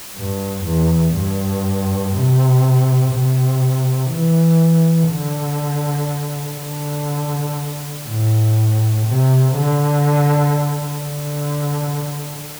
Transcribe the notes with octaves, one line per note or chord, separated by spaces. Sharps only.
G2
E2
G2
C3
C3
E3
D3
D3
A2
C3
D3
D3